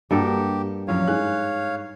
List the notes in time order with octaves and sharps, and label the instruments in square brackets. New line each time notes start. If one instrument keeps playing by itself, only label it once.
[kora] G2 A4 A#4 [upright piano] A#3 F#4 G5 [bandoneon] G4
[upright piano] A#1 F#2 [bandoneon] C#5 F5
[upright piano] G#2 G#4 F#6